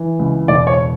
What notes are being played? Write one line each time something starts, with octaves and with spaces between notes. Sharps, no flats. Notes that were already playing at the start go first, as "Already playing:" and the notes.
Already playing: E3
C#2
E1 D5
C#5